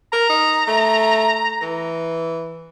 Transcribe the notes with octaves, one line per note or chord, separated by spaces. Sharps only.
A#4 A#5
D#4
A3
E3